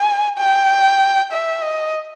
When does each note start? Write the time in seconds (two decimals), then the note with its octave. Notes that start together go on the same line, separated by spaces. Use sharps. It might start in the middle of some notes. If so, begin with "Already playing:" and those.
Already playing: G#5
0.38 G5
1.32 E5
1.63 D#5